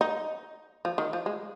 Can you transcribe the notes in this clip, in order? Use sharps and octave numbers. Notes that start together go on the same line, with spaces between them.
D#4
F3
D#3
F3
G#3